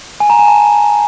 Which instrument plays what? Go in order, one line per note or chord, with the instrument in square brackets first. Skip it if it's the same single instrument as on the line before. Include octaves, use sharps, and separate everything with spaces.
[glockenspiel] G#5
A#5
G#5
A5